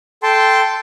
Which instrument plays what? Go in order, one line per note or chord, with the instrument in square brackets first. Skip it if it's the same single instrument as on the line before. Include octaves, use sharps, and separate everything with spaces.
[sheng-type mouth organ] A4 G5 A5 C6